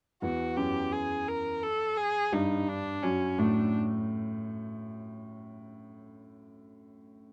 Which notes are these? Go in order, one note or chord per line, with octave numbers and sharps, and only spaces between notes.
E2 E3 F#4
F#2 F#3 G4
G#4
A#4
A4
G#4
G2 G3 D#4
D4
F#2 F#3 C#4
A2 A3 D4